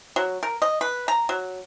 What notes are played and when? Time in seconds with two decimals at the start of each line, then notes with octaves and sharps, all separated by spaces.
0.16 F#3
0.43 A#4
0.62 D#5
0.81 B4
1.08 A#5
1.29 F#3